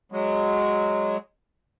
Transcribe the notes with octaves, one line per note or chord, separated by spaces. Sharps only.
F#3 G#3